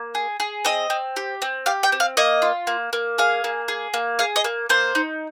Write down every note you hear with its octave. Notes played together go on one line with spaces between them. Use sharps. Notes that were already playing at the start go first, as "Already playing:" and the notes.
Already playing: A#3
G#4
G#4
C4 D#5
C4
G4
C4
G4 F5
G5
C4
F5
A#3 D#5
F4
A#3
A#3
G#4 F5
A#3
G#4
A#3
G#4 F5
D#5
A#3
A#3 C5
D#4